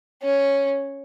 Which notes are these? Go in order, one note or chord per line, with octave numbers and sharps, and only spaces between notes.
C#4